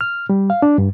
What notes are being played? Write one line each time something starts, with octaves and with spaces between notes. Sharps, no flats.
F6
G3
F5
D4
G2